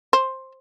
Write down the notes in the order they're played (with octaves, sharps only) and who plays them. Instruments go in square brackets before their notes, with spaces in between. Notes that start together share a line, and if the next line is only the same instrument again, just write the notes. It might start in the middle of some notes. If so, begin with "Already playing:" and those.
[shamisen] C5